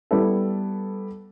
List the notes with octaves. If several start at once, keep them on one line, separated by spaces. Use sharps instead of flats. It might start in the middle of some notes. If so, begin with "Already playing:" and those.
G3 B3 E4 A4